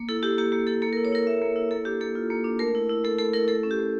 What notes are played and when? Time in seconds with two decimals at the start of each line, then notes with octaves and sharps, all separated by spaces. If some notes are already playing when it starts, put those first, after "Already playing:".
Already playing: A#3
0.09 E4 A4
0.23 E4 G4
0.38 A#3 G4
0.52 A#3 G4
0.67 E4 A4
0.82 A#3 A4
0.93 A#4
0.97 E4
1.05 C#5
1.12 E4 A#4
1.26 A#3 E5
1.42 A#3
1.56 E4
1.71 A#3 A4
1.85 D4 G4
2.00 A#3 A4
2.15 F4
2.30 A#3
2.44 D4
2.59 A3 A#4
2.75 E4
2.89 E4
3.04 A3 A4
3.18 A3 A4
3.33 E4 A#4
3.48 A3 A4
3.63 C#4
3.71 G4
3.79 A3